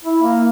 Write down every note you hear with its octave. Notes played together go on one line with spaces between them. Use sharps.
E4
A#3